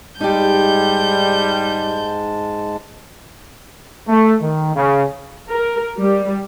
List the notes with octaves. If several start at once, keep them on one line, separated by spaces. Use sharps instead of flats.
G#2 G3 G#3 D#4 G4 A5 G6
A3
D#3
C#3
A#4
G3